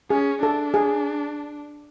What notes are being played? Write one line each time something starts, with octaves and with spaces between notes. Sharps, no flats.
C#4 G#4
D4 A4
G#4